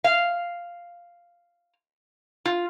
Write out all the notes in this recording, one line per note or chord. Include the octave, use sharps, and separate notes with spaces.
F5
F4